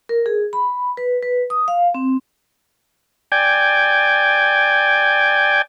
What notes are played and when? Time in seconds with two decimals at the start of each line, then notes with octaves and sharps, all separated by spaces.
0.09 A#4
0.26 G#4
0.53 B5
0.97 B4
1.23 B4
1.50 D#6
1.68 F5
1.95 C4
3.32 D5 G5 G#5